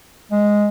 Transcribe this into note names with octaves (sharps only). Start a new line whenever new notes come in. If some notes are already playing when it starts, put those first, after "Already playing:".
G#3